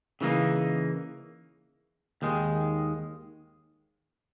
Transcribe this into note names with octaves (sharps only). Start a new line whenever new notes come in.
C#3 E3 G3 A#3 D#4
D#2 D#3 G#3